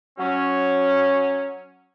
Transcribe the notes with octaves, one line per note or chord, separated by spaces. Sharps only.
F#3 C#4